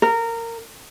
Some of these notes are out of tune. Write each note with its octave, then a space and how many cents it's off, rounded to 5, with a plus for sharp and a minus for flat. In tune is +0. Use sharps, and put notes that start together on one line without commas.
A#4 -20